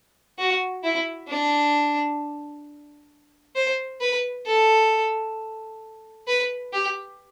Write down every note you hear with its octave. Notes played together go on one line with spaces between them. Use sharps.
F#4
E4
D4
C5
B4
A4
B4
G4